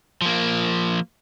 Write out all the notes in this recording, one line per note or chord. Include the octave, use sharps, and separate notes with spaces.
F3 A#3